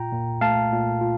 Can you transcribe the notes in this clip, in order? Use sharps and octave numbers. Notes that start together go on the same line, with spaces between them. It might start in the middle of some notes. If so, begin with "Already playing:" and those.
Already playing: A#2 F4 G5 A#5
A#2
A3 F5 A5
A#2
F4